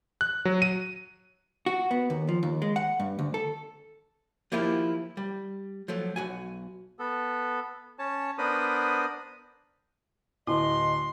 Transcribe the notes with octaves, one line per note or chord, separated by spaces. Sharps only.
F#6
F#3
D#7
F#4
B3
D#2
F3
D#2
G#3
F#5
G2
D2
A4
F3 A#3 E4 F4 G4
G3
F3 F#3 A3
B1 F#4 G#5
B3 A4
C#4 C#5 A5
B3 D4 A#4 C5 B5 D#6
D1 E4 D#5 C6